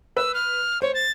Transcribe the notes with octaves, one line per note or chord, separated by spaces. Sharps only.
B4 E6
F6
C5 C#5
A6